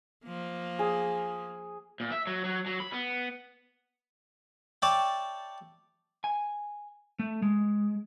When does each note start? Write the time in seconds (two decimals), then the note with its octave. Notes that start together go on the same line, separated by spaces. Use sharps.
0.25 F3 A#3
0.79 G#4
2.00 A#2
2.12 E5
2.27 F#3
2.44 F#3
2.66 F#3
2.80 B5
2.93 B3
4.82 C#5 D5 E5 G5 A5
6.24 G#5
7.19 A3
7.42 G#3